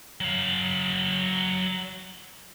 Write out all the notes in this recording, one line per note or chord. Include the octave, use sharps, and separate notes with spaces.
F#3 F5